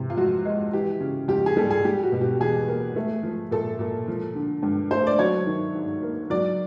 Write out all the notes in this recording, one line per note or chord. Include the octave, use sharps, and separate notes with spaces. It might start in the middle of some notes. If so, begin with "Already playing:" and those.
Already playing: C3 E3
F4
F2 F#4
G#3
E3 G4
C#3
F2 G4
G#4
G3 A4
G#4
G3 G4
F#4
B2
G4
E2 G#4
A#3
A3
F3
A#2 A4
A#2
F3
D3
G2
A3 C5
D5
F#3 C#5
D#3
G#2
A#3
F#3 D5